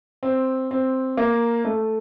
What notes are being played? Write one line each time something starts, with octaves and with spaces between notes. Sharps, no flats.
C4
C4
A#3
A3